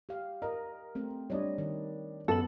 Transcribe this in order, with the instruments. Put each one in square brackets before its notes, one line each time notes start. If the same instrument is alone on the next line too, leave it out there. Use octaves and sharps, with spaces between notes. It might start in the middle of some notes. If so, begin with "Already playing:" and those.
[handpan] G4 F5
[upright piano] A#4 [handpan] D#5
[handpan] A3 C4
[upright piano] G3 D4 [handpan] C#5 D#5
[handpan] D#3
[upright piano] F#2 B3 F#7 [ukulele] A4